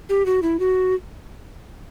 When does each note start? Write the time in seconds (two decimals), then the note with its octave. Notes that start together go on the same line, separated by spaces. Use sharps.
0.09 G4
0.26 F#4
0.43 E4
0.59 F#4